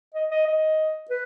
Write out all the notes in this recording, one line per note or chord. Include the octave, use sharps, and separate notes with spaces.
D#5
D#5
D#5
B4